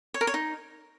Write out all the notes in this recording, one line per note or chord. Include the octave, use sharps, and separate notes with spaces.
C#5
A#4
C#5
D#4